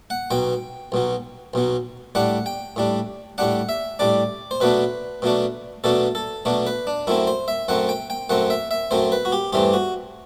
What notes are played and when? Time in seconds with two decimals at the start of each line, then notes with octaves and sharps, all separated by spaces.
0.10 F#5
0.31 B1 B2 F#3 G5
0.92 B1 B2 F#3
1.54 B1 B2 F#3
2.15 A2 G3 D4 F#5
2.46 G5
2.76 A2 G3 D4
3.38 A2 G3 D4 F#5
3.69 E5
3.99 A2 G3 D4 D5
4.51 C5
4.61 B2 F#3 A3 D4 B4
5.22 B2 F#3 A3 D4
5.84 B2 F#3 A3 D4 A4
6.15 A4
6.45 B2 F#3 A3 D4
6.67 B4
6.87 D4
7.07 F#2 F#3 A3 C4 E4
7.27 C5
7.48 E5
7.68 F#2 F#3 A3 C4 F#5
7.89 G5
8.10 G5
8.29 F#2 F#3 A3 C4 F#5
8.50 E5
8.71 E5
8.91 F#2 F#3 A3 C4 C5
9.12 B4
9.25 F#4
9.32 G4
9.53 G2 E3 A3 C4 G4
9.73 F#4